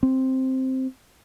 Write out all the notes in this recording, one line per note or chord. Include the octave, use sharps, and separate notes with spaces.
C4